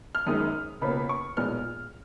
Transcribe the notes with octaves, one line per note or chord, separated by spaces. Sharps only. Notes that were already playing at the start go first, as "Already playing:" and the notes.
F6
G#1 F#2 D#3 G#3 D#4 D#6
C#2 B2 A#3 C#4 B5
C#6
B1 A#2 G#3 B3 F6